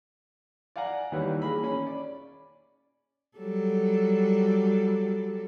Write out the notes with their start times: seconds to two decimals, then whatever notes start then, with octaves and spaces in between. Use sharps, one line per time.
0.76 D5 F5 F#5 G#5 A#5
1.12 D#2 D#3 E3 G3 B4 C#5
1.42 A#3 G#4 B5
1.64 C#4 B5
1.87 D5
3.38 F#3 G3 A4